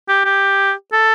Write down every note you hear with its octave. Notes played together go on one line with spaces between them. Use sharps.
G4
G4
A4